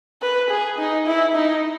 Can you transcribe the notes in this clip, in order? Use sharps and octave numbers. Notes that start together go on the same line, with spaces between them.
B4
G#4
D#4
E4
D#4